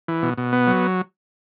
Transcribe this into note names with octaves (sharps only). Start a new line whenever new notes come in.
E3
B2
B2
B3
F#3